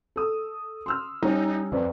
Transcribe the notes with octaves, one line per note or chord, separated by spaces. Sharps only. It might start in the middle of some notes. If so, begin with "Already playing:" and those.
A4 D#6 E6
C6 E6 F6
G3 C#4 D#4 C#5
F2 C4 B4 D5